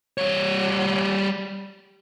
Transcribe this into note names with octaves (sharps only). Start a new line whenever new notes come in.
G3 C#5